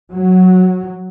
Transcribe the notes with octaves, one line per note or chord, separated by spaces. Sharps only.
F#3